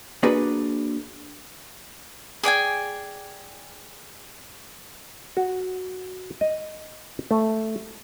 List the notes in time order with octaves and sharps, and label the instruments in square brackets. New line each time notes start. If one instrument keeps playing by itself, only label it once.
[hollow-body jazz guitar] A#3 D4 F#4 G#4 B4
[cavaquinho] G#4 D5 G5 G#5
[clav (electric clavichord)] F#4
D#5
A3